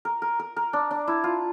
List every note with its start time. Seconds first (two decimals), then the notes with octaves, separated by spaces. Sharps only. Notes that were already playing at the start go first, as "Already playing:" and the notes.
0.05 A#4
0.22 A#4
0.39 A#4
0.56 A#4
0.73 D4
0.91 D4
1.07 E4
1.24 F4